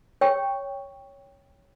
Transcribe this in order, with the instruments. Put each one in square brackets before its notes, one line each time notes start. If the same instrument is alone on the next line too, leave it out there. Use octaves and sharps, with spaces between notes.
[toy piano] C#5 G5 C#6